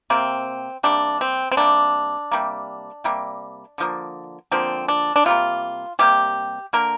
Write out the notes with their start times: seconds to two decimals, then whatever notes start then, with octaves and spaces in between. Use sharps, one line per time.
0.10 C3 A#3 C4
0.83 C3 G3 A#3 D4
1.21 C4
1.52 C4
1.57 C3 G3 A#3 D4
2.32 C3 G3 A#3
3.04 C3 G3 A#3
3.78 D3 F3 A#3
4.52 D3 F3 A#3 C4
4.88 D4
5.16 D4
5.26 C3 G3 A#3 F4
5.99 C3 G3 A#3 G4
6.73 D3 A#3 A#4